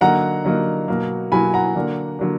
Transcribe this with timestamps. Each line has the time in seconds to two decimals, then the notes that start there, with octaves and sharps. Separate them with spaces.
0.01 D3 F#3 A#3 D#4 F#5 A#5
0.45 D3 F#3 A#3 D#4
0.88 B2 F#3 A#3
1.32 B2 F#3 A#3 G#5 B5
1.54 F#5 A#5
1.75 D3 F#3 A#3 D4
2.19 D3 F#3 A#3 D4